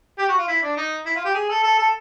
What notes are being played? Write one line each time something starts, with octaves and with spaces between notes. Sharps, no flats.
G4
F#4
F4
E4
D4
D#4
E4
F4
G4
G#4
A4
A4
A4